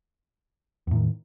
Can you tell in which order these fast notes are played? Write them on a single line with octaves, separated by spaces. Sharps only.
E2 A2 D#3